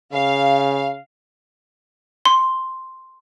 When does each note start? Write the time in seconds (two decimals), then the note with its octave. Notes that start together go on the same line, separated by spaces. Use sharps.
0.13 C#3 F5
2.26 C6